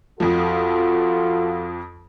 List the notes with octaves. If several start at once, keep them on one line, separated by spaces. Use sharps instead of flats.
F2 F3 F4 F#4 A4